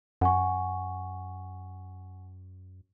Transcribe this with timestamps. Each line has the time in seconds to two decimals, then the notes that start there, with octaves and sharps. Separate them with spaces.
0.21 F#2 F#5 G#5 C#6